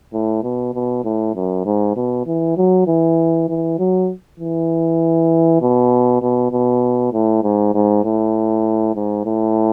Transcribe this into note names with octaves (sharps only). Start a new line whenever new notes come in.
A2
B2
B2
A2
F#2
G#2
B2
E3
F#3
E3
E3
F#3
E3
B2
B2
B2
A2
G#2
G#2
A2
G#2
A2